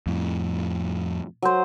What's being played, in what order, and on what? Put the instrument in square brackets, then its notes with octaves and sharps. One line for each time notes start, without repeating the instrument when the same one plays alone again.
[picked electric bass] F2 A2
[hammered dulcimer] F#3 C5